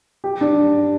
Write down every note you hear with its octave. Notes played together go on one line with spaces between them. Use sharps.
G4
D4